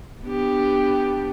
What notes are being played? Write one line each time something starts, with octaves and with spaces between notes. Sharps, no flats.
B3 D4 G4